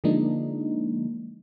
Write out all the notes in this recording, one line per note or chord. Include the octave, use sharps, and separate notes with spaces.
D3 F3 G#3 A#3 D4 D#4